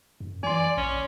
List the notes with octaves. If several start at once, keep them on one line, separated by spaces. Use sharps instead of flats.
F#2
E3 D5 G#5 C6
A#1 C#4